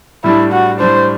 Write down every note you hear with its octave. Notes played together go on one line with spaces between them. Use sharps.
A2 G3 D4 E4
F#4
A2 G3 D4 C5